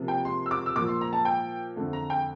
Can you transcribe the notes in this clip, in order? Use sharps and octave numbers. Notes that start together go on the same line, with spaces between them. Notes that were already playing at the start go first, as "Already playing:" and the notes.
Already playing: C3 F3 A#3
G5
C6
E6
D6
E6
A#2 F3 A#3 D6
C6
A#5
A5
G5
F2 D3 A3
A#5
G5